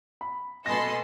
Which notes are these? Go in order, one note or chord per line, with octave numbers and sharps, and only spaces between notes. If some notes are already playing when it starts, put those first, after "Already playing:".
B5
B2 A4 D#5 G#5 B5 C6 A#6